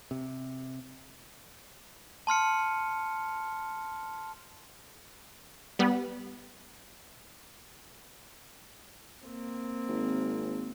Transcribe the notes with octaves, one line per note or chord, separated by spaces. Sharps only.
C3
A5 C6 F6 C#7
G3 B3
A#3 C4
G#1